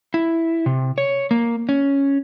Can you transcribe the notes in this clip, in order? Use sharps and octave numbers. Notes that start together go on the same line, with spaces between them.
E4
C3
C#5
A#3
C#4